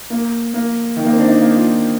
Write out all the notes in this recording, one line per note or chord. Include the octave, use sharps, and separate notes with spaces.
A#3
A#3
D#3
A#3
C4
D4
D#4
A#3
F4